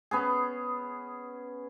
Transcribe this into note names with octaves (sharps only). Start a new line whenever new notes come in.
B3 C#4 G#4